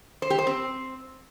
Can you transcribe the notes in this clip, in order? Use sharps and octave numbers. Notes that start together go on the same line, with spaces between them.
C5
G4
C5
C4